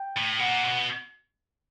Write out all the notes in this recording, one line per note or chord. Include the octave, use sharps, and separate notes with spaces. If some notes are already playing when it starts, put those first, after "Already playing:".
Already playing: G5
A2
A#2 F#5
B2